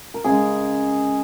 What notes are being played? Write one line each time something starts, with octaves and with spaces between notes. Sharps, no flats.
A#4
C#3 G#3 G#4